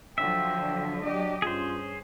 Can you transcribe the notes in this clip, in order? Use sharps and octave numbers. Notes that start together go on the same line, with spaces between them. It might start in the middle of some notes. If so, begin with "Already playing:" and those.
D3 F3 F#3 E5 G5
F#3 D4 G4 D#5
G2 C#4 F4 G#4 C5